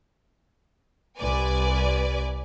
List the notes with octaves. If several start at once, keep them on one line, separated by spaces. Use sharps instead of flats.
C2 B4 D5 G#5